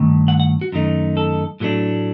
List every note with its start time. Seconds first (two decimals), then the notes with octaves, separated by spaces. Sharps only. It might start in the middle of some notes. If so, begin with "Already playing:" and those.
Already playing: G2 D#3 A3
0.28 F#5
0.40 F#5
0.61 F#4
0.72 F#2 D#3 A3 D#4
1.17 A4
1.60 A2 F#3 A3 D4